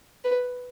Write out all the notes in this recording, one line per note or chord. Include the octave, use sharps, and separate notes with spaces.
B4